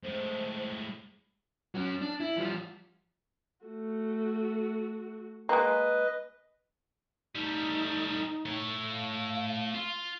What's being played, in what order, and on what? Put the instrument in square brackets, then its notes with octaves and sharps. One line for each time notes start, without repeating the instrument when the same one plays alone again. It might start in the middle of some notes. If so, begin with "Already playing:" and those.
[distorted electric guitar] A2 G#3 [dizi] C5
[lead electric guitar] F#3 C#4
D4
E4
F3 G3
[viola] A3 F#4
[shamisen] G#3 A#3 [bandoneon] B4 D#5
[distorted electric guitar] G3 A3 [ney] D#4
[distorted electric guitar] A3 C#5
[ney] F5
[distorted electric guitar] F4